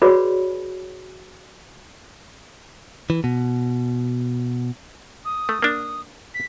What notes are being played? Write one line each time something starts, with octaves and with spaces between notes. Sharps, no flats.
F#4 G#4 B4 C#5 D5 B5
E3
B2
D#6
A3
A#3 D4
B6